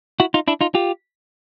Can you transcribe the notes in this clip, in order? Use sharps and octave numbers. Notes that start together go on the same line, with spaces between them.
E4 F#4
D#4 F4
D4 E4
D#4 F4
F4 G4